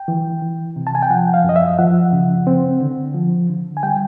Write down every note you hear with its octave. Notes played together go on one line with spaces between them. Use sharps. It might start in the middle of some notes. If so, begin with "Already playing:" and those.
Already playing: G5
E3
E3
C3
A5
G#5
G5
F3 F#5
F5
F#2 D#5
E5
F3 F#5
C#3
C4
D3
F3
D3
G#5
G3 G5